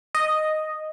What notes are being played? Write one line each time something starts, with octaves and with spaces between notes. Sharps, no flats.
D#5